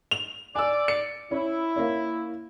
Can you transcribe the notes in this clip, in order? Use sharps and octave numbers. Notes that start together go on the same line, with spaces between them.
F7
D5 G#5 E6
C#7
C#4 E4
A#3 C#4